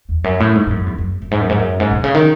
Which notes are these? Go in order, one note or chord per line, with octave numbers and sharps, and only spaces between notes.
E2
F#2
A2
G#2
G#2
F#2
E2
F#2
F#2
G#2
F#2
G#2
F#2
G#2
B2
C#3
D#3